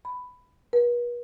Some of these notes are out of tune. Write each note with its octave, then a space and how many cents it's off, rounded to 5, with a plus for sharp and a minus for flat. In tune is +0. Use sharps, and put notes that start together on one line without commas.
B5 +10
B4 -45